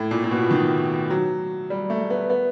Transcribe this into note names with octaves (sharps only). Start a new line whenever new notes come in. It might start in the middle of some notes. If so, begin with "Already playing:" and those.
Already playing: A2
A#2
A#2
B2
D#3
F#3
G3
A3
B3
B3